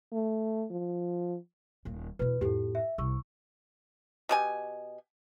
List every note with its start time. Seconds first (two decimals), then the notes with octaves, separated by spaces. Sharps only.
0.13 A3
0.71 F3
1.85 D#1 A#3
2.19 E2 B2 B4
2.41 F2 A2 G4 A4
2.75 E5
2.98 C2 C3 C#6 E6
4.29 B2 G4 G#5